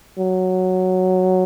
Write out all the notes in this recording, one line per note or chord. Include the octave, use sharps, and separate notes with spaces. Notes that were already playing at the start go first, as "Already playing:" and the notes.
F#3